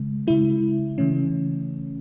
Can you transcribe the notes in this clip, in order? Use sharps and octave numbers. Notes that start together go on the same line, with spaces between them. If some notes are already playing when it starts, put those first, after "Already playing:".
Already playing: C#3 G#3
C#3 G#3 E4
C#3 E3 A3 C#4